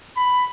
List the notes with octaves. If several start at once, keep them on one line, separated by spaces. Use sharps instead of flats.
B5